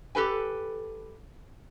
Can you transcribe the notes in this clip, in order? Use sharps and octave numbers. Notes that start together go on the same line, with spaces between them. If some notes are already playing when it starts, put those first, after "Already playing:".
G4 A4 B4 G#5